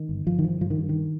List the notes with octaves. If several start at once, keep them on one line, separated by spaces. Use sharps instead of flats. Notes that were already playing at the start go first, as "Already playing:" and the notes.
Already playing: D#3
G1
G1 F3
D#3
G1 F3
G2 F3
D#3
G2
D#3